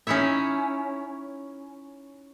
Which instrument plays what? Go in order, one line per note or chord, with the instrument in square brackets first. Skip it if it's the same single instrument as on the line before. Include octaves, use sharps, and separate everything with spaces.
[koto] C#4 D#4 E4 C#5 E5